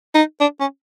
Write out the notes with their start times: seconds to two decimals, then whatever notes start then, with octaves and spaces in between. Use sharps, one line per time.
0.15 D#4
0.40 D4
0.60 C#4